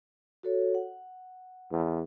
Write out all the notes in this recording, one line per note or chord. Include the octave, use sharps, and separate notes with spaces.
F#4 A4 C#5
F#5
E2